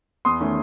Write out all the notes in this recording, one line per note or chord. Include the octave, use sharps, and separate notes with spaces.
E2 C6 D#6
D#3 A3 C#4